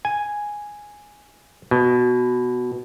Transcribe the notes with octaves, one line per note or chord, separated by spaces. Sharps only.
G#5
B2